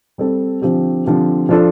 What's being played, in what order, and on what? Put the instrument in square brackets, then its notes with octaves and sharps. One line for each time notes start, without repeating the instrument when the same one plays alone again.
[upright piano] G3 C4 A4
D3 F3 C4 G4
D3 F3 C4 G4
F3 D4 F4 A4